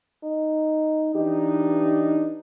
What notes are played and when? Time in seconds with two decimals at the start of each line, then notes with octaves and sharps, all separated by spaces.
0.24 D#4
1.15 E3 D4 D#4 G4